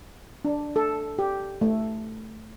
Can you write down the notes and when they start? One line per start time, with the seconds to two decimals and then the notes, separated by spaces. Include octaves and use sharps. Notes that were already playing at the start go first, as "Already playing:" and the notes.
0.45 D4
0.76 A4
1.19 G4
1.61 A3